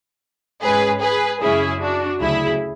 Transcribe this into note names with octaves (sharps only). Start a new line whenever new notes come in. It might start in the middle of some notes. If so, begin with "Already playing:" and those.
G#2 G#3 C#4 G#4 B4
G#4 B4
F#2 C#3 G#3 C#4 E4 G#4
D4 F#4
D2 C#3 F#3 E4 G#4